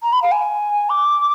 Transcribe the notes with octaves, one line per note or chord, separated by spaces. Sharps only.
A#5
B5
F5
G#5
D6